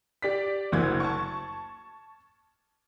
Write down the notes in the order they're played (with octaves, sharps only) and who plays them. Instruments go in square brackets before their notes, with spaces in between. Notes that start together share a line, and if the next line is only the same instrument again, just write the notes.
[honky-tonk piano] G4 D5 B6
F#1 D2 A#3 G#6
A5 C#6